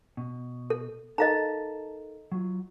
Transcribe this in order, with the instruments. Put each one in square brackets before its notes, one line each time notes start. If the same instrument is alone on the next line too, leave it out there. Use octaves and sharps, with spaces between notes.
[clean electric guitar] B2
[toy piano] A4
[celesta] D#4 A4 A#4 [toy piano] D#5 F5 A#5 [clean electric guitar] A5
[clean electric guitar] F#3 F4